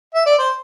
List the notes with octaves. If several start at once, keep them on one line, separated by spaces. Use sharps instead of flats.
E5
D5
C5